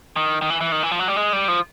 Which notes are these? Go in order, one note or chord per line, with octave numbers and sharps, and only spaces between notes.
D#3
D#3
E3
E3
D#3
E3
F3
F#3
G3
G#3
G3
F3